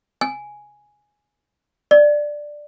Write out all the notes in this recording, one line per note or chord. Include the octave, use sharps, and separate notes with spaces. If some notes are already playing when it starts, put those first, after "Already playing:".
G#5
D5